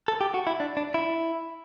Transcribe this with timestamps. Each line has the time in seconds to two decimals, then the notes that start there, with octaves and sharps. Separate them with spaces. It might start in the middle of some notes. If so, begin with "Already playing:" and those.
0.08 A4
0.21 G4
0.34 F#4
0.47 E4
0.60 D4
0.77 D4
0.94 E4